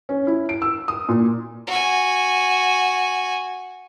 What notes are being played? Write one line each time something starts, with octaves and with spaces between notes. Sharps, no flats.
C#4
E4
D7
E6
D#6
A#2
F#4 G#5